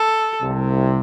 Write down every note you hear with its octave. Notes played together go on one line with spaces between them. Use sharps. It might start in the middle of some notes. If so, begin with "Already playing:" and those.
Already playing: A4
C2 C3